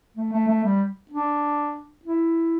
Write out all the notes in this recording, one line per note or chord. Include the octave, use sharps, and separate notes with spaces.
A3
A3
A3
G3
D4
E4